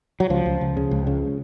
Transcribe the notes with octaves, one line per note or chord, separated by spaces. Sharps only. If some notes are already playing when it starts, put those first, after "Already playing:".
F#3
C#2 F3
C#2
C#2
C#3
C#2
C#3